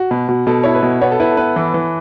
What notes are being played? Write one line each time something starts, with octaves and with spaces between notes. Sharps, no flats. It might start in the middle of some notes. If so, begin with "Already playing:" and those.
Already playing: F#4
B2
B2
B2 A4
E4 C#5
B4
B2
B3 C#5
A4
E4 B4
A4
B3 B4
E3
E3